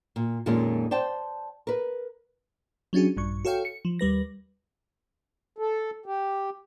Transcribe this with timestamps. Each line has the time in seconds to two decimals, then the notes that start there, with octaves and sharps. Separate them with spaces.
0.16 A#2
0.46 F2 A#2 D#3 G#3 A#3 C#4
0.91 C5 D5 G5 A5
1.67 A#4 B4
2.93 F#3 C#4 D4 F#4 G#4
3.17 A#1 G2 C#6
3.45 F#4 A4 C#5 F5 G5
3.65 C#7
3.85 F3
3.99 D#2 G3 B4 A#6
5.58 A4
6.06 G4